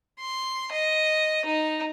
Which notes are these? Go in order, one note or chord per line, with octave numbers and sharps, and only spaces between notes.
C6
D#5
D#4